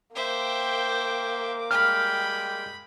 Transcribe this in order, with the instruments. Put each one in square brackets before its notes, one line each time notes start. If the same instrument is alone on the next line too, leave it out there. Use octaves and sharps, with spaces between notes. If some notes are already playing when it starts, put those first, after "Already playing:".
[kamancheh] A#3 D6 [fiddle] C5 E5 [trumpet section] G5
[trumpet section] G3 G#3 G5 [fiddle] B5 [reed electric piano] F6